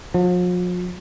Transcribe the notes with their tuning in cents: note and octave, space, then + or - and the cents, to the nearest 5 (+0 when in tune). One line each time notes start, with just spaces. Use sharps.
F3 +45